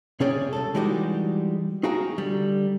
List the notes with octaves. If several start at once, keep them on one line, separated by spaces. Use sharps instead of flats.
C3 C#4 G#4 C#5 D5 G5
C2 F#2 A4
E3 G3 G#3 D#4 F#4 G4
D#4 F#4 G#4 F5 G5 A#5
D3 G3